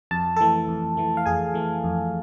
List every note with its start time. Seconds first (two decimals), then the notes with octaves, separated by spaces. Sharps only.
0.11 F2 A5
0.36 E3 A3 A4 A5
0.68 F2
0.97 E3 A3
1.17 F5
1.26 F2 G#4 G#5
1.54 E3 A3
1.84 F2